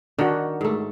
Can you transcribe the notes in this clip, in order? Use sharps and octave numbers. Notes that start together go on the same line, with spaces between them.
D#3 D4 F#4
G#2 A3